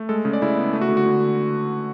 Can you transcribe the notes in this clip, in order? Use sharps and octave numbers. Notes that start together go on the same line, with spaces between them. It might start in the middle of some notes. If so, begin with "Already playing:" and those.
Already playing: A3
G#3 A4
C#3
D5
C#3 E4
B3
A3
F#4
D3
F#4
D3